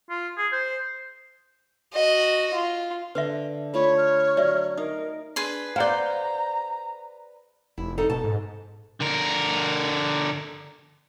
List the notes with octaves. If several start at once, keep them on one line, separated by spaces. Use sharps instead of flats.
F4
G#4
C5
F#4 D#5
F4
D3 B4 E5 C6
A3 F4 C#5 B5
F6
F#3 D5 E5
D#4 A#4 F5 D#6
D4 G#4 B4 C6
C5 D5 F5 F#5 A#5 G6
F1 E4
D#4 A4
B2 A5
G#2
D3 A#4